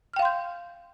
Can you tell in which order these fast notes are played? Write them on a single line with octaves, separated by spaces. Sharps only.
F6 G5 F5 C6 G6